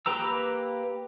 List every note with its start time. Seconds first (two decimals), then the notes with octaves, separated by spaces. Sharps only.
0.06 A#3 G4 B4 A#5 E6